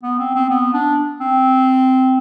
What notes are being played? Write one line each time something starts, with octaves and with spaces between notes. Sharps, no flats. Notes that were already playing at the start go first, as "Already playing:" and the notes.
B3
C4
C4
B3
D4
C4